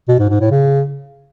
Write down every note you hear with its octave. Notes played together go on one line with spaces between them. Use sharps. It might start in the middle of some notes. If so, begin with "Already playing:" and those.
B2
G#2
G#2
A2
C#3